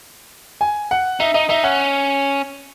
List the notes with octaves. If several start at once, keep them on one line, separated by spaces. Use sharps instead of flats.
G#5
F#5
D#4 E5
D#4 D#5
D#4 E5
C#4 F#5